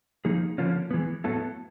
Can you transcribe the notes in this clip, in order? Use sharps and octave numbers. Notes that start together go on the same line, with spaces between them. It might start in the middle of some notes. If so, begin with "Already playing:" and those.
F3 A#3 D#4 G#4
D3 F3 A#3 C#4 F4
E3 G#3 B3
A2 F#3 B3 E4 A4